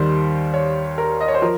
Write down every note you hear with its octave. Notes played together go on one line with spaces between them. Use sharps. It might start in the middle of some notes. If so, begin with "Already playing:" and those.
Already playing: D#2 D#3 G3 C5
C#5
A#4
D#5
C#5
C5
F3 A#4